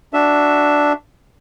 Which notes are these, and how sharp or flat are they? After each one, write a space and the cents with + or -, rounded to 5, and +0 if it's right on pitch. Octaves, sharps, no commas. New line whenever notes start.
D4 +0 F#4 +0 E5 +0